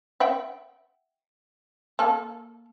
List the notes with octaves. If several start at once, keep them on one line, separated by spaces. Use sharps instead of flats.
E5 F#5 G5
A#3 A4